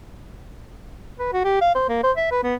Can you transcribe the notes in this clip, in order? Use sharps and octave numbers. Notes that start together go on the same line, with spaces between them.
B4
F#4
G4
F5
C5
A#3
C5
E5
B4
B3